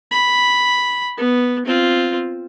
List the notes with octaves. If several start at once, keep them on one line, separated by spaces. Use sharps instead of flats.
B5
B3
C4 F4